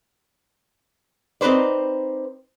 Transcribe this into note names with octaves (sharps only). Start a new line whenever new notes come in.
C4 D#4 B4 C5 D5